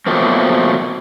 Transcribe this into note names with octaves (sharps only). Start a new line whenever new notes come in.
B2 F3 F#3 A3 A#3 C4